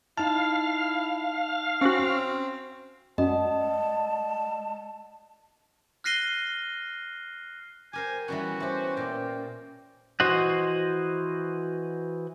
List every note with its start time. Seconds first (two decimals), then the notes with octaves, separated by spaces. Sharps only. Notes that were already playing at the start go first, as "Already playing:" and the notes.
0.18 D#4 E4 F5 A5
1.81 C4 C#4 F#4
3.18 F#2 G#3 D5 D#5 F#5 A5
6.04 F6 F#6 A#6 C7 D#7 G7
7.93 G4 A#4 C5 G#5
8.28 E3 G3 B3 C#4 F#4
8.60 A3 G4 C5
8.97 A#2 G5
10.20 E3 F#4 C5 D#5 F#5